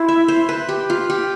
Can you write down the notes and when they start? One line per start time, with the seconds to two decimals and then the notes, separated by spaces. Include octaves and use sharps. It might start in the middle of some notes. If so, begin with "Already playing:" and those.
Already playing: E4 C5
0.08 E5
0.28 C5
0.49 B4
0.69 G4
0.90 F4
1.10 G4